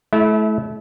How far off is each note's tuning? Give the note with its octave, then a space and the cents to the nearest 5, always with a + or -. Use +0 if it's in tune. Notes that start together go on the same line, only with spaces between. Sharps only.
A3 -35 E4 -5